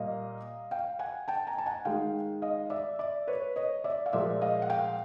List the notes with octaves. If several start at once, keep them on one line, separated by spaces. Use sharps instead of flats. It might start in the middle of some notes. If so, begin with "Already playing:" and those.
Already playing: A#2 G3 A#3 D#5 F5
F5 G5
F#5 G#5
G5 A5
G#5 A#5
A5
F#5 G#5
D#3 G#3 F5 G5
D#5 F5
D5 E5
D5 E5
B4 C#5
C#5 D#5
D5 E5
F5
A#2 F3 G#3 D5 E5
D#5 F5
F#5
F5 G5